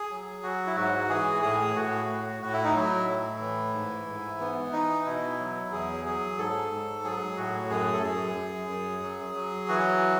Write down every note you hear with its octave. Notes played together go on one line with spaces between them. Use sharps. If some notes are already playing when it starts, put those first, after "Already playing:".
Already playing: G#4
F#3
F#3 F#4
E4
G#2 F#4
E3 G#4
A2 G#4
A2 F#4
A2
A2 F#4
E4
D#4
F#3 E4
A2
E3
G#2
G#2
E3 B3
E3 D#4
B2 E4
F#3
E2 G#4
F#3 G#4
G#2 A4
G#2
F#3 G#4
A2 F#4
F#2 G#4
A4
F#2 G#4
F#2
F#2
F#3
F#3
E3 F#4